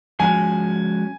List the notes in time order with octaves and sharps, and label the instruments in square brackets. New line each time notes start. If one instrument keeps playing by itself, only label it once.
[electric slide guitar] F3 G#3 C#4 F#4 [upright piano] G#5